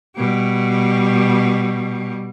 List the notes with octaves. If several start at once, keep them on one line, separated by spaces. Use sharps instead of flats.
B2 G3